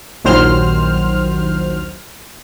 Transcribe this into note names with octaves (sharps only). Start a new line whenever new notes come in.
A#1 D#2 D#3 F#3 C5 F6